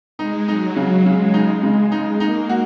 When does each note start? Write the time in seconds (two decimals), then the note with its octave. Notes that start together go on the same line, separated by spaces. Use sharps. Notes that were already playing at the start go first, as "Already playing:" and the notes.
0.19 G#3 D#4
0.48 F#3 D#4
0.76 C#3 F#3
1.06 C#3 G#3
1.34 D#4
1.63 C#3
1.91 G#3 D#4
2.20 A#3 D#4
2.49 F#4